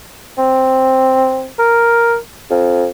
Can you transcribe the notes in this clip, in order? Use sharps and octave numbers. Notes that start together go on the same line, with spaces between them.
C4
A#4
F2